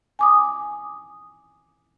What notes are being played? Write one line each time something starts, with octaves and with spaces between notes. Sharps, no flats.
G#5 D6 D#6